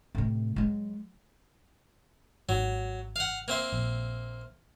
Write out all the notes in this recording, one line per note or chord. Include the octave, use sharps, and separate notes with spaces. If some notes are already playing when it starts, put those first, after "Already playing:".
A2 C3
F#3 G#3
G#1 F#3
F5 F#5
A#3 C4 E5
A#1